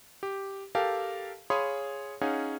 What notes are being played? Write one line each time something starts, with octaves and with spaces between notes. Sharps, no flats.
G4
G4 A4 A#4 F5 G5 A5
G#4 C#5 F5 B5 C6 D#6
C#4 D#4 G#4 C#5 F5 F#5